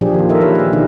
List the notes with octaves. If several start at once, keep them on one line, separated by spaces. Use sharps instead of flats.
A#2 F3 D4 G4 G#4
D#3 F4
A4 A#4 D#5 E5
E3 A#3 E4 G4 B4 C#5
G#4 F5
B2 D#3 D4 D#4 G4 G#4